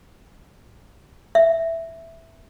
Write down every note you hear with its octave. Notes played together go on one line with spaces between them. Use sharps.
E5